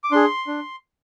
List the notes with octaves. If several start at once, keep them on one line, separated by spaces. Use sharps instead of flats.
D6
D4 G#4 C6
D4